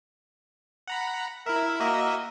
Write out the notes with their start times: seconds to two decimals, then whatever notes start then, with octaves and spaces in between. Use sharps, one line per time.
0.88 F#5 A#5 B5
1.46 E4 A#4 E5
1.80 A#3 F#4 D#5 E5